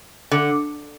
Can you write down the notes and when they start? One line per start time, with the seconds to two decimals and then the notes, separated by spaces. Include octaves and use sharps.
0.32 D3